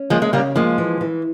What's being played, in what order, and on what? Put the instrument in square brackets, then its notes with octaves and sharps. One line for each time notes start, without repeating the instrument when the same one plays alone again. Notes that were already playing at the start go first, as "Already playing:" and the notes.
Already playing: [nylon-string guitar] C#4
[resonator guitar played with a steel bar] F3 G#3 [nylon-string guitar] A#3
[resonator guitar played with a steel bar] G#3
[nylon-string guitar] C#3 [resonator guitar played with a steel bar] G3 A#3
[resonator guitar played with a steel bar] F3 G#3 [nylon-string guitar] A#3
[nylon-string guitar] E3
E3